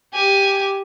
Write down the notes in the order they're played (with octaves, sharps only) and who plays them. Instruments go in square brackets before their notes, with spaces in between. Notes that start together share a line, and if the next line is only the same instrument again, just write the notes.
[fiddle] G4 G#5